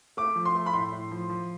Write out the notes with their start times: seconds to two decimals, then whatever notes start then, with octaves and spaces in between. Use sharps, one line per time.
0.17 A3 D6
0.36 F3
0.45 C6
0.55 A3
0.66 B5
0.73 A2 C6
0.92 A2
1.11 F3
1.30 F3